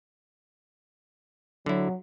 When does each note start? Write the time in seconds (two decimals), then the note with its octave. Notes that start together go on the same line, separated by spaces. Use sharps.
1.66 D3 F#3 E4